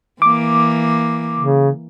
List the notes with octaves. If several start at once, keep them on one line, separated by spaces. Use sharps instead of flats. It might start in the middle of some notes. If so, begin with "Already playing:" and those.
E3 A#3 D6
C#3